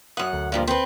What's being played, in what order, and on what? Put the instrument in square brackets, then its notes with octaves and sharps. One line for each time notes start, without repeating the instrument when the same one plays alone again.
[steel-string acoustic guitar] F#2 F#5 [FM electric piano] D#6
[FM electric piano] D2
[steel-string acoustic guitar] G2 A#2 F3
C4 B4